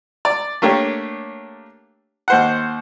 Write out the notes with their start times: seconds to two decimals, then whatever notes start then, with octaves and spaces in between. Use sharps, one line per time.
0.25 D5
0.62 A3 A#3 D4 G4 C#5
2.28 D#2 C5 F#5